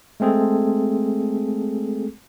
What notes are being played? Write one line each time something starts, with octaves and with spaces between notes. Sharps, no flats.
G#3 A3 C4 G#4 A4